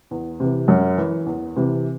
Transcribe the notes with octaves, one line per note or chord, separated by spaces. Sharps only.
E2
C3 E3
F#2
E3
E2
C3 E3